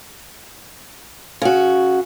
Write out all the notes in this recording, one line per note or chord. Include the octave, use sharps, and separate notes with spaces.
C#3 F#4